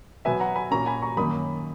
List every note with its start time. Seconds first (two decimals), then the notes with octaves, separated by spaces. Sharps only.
0.25 B2 F#3 B3 E5 G#5
0.40 F#5 A#5
0.56 G#5 B5
0.71 A#2 A#3 C#4 A#5 C#6
0.86 G#5 B5
1.02 A#5 C#6
1.17 F#2 D#3 A#3 C#4 B5 D#6